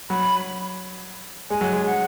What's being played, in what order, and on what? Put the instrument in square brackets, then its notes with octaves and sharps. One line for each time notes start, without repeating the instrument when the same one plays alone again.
[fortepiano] F#3 [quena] B5
[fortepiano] G#3 [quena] G#5
[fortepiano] F#3
G#3
[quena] F#5